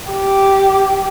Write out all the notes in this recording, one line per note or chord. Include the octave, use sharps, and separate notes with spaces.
G4